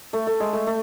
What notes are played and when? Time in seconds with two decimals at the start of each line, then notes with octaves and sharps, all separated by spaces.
0.13 A3
0.27 A3
0.40 G#3
0.53 A3
0.67 A3